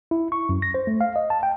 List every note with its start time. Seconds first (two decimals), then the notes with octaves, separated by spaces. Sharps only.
0.11 E4
0.32 C#6
0.49 F#2
0.62 A#6
0.74 C5
0.87 A3
1.01 F5
1.16 D#5
1.30 A5
1.43 G5